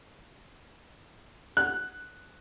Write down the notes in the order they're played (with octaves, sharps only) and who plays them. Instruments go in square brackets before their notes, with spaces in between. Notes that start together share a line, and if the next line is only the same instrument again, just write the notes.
[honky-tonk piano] F#6